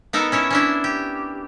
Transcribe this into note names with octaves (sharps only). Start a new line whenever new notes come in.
B3 D#4 A4 A#4
C#4 E4 C#5
C#4 D4 E4
G4